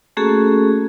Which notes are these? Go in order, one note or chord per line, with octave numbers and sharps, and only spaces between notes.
A3 A#3 C#4 F#4 G#4 A4